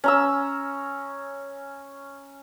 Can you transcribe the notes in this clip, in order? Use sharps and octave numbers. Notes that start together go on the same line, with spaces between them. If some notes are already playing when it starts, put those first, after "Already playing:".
C#4 A#5 E6